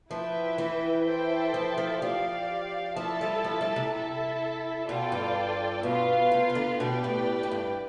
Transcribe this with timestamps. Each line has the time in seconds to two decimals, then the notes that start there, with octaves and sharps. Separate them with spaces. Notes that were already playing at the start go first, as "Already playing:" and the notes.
0.10 F3 E4 B4 E5 G5
0.58 E3
1.06 E4 A4 C5 E5 G5
1.54 F3
1.78 F3
2.02 F3 G4 D5 F5
2.96 F3 E4 A4 E5 A5
3.21 G3
3.44 F3
3.61 G3
3.76 C3
3.93 E4 A4 E5
4.88 B2 F4 A4 D5 G5
5.12 G2
5.83 B2 B3 F4 B4 F5
6.32 C3
6.49 C3
6.55 D3
6.80 B2 G4 B4 D5 G5
7.04 A2
7.43 A2
7.51 G2